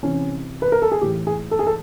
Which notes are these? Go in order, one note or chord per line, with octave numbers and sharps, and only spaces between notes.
C3 E3 C#4
B4
A#4
A4
G#4
A2 E3 G4
G#4
A4
G#4
A4